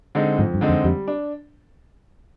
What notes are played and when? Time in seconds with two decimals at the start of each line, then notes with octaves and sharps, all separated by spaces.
0.15 D3 G#3 C4 D#4
0.38 F2 G#2
0.54 G2
0.61 D3 G#3 C4 D#4
0.69 F2
0.84 F2 G3
1.08 D4